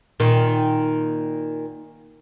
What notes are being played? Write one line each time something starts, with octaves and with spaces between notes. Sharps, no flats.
A#2 D#3